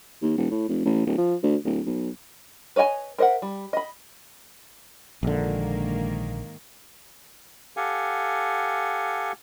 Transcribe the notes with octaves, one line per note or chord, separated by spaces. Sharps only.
D#2
E1
A2
F1
A1
D1
F3
D2
D1
B1
B4 C#5 D#5 G5 G#5
A#4 C5 D#5 E5 F#5
G3
D#5 B5
A#1 G#2 D3 D#3 A#3
G4 A4 F5 F#5 G#5